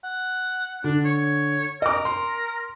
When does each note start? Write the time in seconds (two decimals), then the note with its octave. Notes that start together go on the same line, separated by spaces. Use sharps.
0.04 F#5
0.84 D3 D4
1.05 C#5
1.82 A#4 D#5 D6
2.05 C6